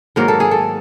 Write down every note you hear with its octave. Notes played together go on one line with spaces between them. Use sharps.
G#2 D#3 F#3 A#3 A#4
A4
G#4
A4